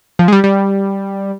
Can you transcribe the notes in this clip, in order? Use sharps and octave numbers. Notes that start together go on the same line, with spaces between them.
F3
G#3
G3
G3